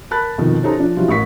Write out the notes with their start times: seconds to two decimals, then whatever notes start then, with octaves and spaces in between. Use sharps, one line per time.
0.11 A#4 A5 B5 F#6 A6
0.38 F2 B2 D#3 F3
0.63 C#4 D#4 G4 A4 C5 A#5
0.78 F3 D4
0.96 E3 F#3 G3 F4
1.08 A1 A#4 C#6 B6